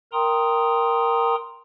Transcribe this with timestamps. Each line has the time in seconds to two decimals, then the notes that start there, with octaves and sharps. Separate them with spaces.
0.13 A#4 G5 A#5 C6 D#6